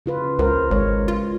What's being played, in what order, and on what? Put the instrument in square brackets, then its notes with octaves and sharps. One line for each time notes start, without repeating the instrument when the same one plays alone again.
[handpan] C#3 F4 B4
[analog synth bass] C#2 [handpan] F4 A#4 C5
[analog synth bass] G#1 [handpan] G#3 C#5
[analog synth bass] F4